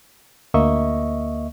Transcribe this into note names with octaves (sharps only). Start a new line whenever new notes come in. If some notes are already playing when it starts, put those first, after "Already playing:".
D2 A#3 D#5 E5 C#6